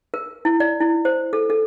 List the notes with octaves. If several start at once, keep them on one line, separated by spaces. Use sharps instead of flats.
A#4
E4
D5
E4
C5
A4
A4